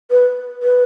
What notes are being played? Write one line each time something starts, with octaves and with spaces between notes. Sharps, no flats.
B4
B4